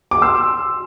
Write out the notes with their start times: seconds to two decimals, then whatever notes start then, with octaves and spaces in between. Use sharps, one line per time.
0.11 D6
0.22 C6 E6